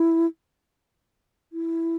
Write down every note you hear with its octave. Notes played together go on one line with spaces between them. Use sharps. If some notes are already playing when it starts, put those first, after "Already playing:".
Already playing: E4
E4